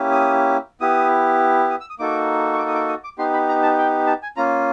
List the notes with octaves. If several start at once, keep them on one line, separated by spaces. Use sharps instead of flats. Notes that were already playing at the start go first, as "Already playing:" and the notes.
Already playing: A#3 C#4 E4 G4
D#6
B3 E4 G4 D#6
D#6
E6
D#6
A#3 D#4 F#4 A4 D6
C#6
D6
D#6
D6
D#6
D6
B3 D#4 G4 C6
B5
A#5
A5
G5
A5
G#5
A#3 C#4 F4 A#5